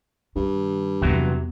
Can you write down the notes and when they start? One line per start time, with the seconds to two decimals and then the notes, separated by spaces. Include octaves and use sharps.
0.36 G2 D#3
1.02 E2 C3 E3 F#3 D#4